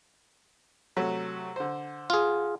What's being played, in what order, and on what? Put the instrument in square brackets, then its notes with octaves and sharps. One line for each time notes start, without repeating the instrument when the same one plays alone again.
[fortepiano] C3 F#3 A3
D3 C5
[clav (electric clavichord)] F4 G#4